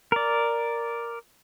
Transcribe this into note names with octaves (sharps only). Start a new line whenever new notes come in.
A#4 D5